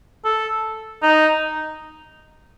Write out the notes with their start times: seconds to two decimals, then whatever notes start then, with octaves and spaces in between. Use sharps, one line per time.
0.24 A4
1.03 D#4